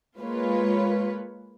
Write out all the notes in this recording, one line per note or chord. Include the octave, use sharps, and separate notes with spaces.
G#3 A#3 F4 B4 C#5